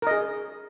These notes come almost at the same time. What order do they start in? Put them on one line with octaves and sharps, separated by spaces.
A#4 D#5 G#4